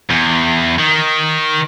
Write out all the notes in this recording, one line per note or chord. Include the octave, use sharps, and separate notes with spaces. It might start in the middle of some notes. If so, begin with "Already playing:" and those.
E2
D#3